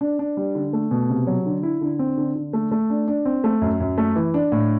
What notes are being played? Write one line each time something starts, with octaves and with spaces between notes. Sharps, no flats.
D4
D4
G3
D3
A3
B2
C3
F#3
D3
E4
D3
C4
D3
D3
A3
A3
D4
D4
C4
A3
F#2
F#2
A3
E3
D4
A2